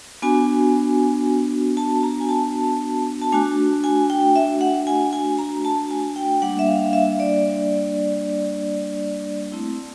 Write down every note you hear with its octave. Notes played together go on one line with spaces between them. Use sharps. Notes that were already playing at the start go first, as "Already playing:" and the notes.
B3 D4 F#4 G#5
A5
A#5
G#5
A5
A5
A3 D4 F#4 G#5
G#5
G5
E5
F#5
G#5
G#5
A#5
A5
G#5
G5
G3 A#3 D4 F#5
E5
F5
F5
E5
D5
A3 C4 E4